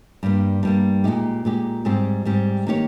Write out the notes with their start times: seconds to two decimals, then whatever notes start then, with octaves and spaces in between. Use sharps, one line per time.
0.23 G2 G3 A#3
0.63 G2 G3 A#3
1.04 A#2 G#3 D#4 G4
1.45 A#2 G#3 D#4 G4
1.85 G#2 G3 C4 G4 C5
2.25 G#2 G3 C4 G4 C5
2.67 D#3 A#3 D#4 G4 C#5